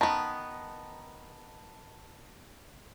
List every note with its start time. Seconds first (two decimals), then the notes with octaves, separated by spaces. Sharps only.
0.01 D#3 B3 A5 A#5